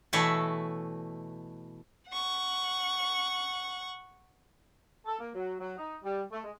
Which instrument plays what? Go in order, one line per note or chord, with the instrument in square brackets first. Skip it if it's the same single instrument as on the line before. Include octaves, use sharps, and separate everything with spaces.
[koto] B2 E3 A3 C#5 E5 A5
[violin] F#5 C#6
[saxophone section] A4
A#3
F#3
F#3
D#4
G3
A3
G#3